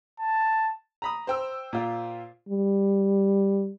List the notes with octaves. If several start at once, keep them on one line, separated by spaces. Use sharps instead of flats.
A5
A#5 B5 D#6
C5 G5 E6
A#2 F4
G3